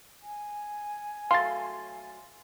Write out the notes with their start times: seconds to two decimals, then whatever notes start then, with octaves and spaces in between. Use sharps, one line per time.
0.22 G#5
1.31 F#3 A3 F5 C6 A6